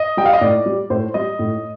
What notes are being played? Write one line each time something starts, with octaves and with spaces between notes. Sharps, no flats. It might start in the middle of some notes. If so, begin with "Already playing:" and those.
Already playing: D#5
G3 G5
F5
D#5
A2 D5
G3
A2 C5
G3 D#5
A2